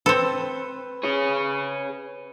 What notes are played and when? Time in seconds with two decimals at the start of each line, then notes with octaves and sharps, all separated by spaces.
0.06 C4 A4 B4
1.03 G#4 C#5